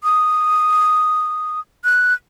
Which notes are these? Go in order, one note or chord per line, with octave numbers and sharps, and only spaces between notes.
D#6
F#6